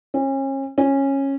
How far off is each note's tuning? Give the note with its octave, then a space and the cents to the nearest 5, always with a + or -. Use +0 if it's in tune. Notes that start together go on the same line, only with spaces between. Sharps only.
C#4 -35
C#4 -15